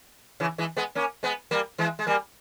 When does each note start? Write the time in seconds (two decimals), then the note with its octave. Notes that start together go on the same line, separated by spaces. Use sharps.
0.40 C#3 E3
0.58 E3 G#3
0.77 G#3 B3
0.95 A#3 C#4
1.23 G#3 B3
1.51 G3 A#3
1.78 E3 G#3
1.99 G#3
2.07 G3 A#3